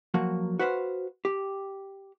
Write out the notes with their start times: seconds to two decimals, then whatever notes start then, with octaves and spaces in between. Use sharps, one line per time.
0.14 F3 F#3 A#3 F#4
0.59 F#4 B4 C5 E5 F5
1.25 G4